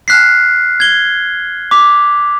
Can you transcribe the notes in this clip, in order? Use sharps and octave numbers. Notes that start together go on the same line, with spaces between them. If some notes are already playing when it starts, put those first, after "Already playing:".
F6 F#6 B6 C7
G#6 G7
D6 B6 F7